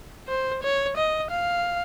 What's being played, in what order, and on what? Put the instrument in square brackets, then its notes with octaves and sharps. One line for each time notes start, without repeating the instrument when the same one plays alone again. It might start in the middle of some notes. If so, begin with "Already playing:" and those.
[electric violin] C5
C#5
D#5
F5